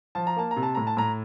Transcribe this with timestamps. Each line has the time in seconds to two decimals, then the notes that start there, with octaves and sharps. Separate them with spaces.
0.15 F3 A5
0.27 A#5
0.36 A#3 A5
0.51 A#5
0.56 C3
0.63 A5
0.75 A2 A#5
0.87 A5
0.97 A2 A#5